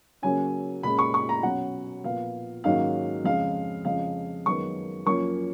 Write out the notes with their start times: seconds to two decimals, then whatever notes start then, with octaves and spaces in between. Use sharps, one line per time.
0.22 C#3 F#3 A#3 C#4 G#5
0.83 A#2 G#3 C#4 B5
0.99 C#6
1.14 C#6
1.29 A#5
1.43 B2 F#3 C#4 F#5
2.04 A#2 F3 B3 F5
2.64 G#2 D#3 F#3 A#3 C#4 F5
3.24 F2 C#3 G#3 F5
3.85 F2 C#3 G#3 F5
4.46 F#2 D#3 G#3 B3 C#6
5.06 F#2 F3 A#3 C#4 C#6